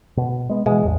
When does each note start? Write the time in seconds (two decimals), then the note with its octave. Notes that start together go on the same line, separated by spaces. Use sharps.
0.17 B2
0.49 G#3 B3
0.66 B2 E3 G#3
0.84 A1 E2 G2